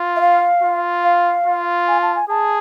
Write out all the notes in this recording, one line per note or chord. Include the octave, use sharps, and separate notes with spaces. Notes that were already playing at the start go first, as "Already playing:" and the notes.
Already playing: F4
E5
F5
F4
F5
F4
G#5
A5
G#5
G#4 A5